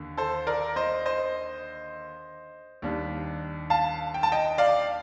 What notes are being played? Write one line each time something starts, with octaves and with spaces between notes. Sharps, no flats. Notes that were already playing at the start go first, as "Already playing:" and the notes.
Already playing: D#2 D3
A4 C5
A#4 D5
C5 D#5
C5 D#5
D#2 D#3 G3 D4
F5 A5
G5
A5
D#5 G5
D5 F5